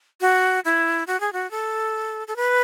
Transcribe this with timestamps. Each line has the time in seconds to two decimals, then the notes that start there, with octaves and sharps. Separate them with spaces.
0.21 F#4
0.65 E4
1.07 F#4
1.20 G#4
1.33 F#4
1.51 A4
2.27 A4
2.36 B4